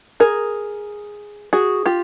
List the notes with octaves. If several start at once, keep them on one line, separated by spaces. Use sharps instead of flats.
G#4 A#4
F#4 G#4
F4 G4